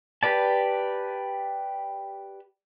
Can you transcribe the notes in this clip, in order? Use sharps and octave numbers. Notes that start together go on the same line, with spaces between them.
G4 B4 D5 A5